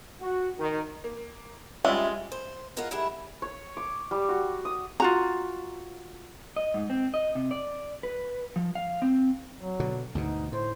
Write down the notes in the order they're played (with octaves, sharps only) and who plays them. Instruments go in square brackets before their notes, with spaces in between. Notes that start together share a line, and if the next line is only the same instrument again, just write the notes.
[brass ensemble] F#4
D#3
[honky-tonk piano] A#3
[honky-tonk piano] G3 C#4 F4 [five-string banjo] G#3 [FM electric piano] E5
[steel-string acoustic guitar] C5
E2 G#3 F4 A#4 F5 F#5
D3 G3 E4 G#4 E5 F#5
[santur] C#5
D6
G3
F#4
D#6
[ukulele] F4 F#4 A#5
[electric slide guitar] D#5
G#2
C4
D#5
C3
D5
B4
F3
F5
C4
[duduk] F#3
[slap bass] B2 D3
[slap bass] D2 G#2 B2 [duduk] D#4
[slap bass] A2 [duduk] C5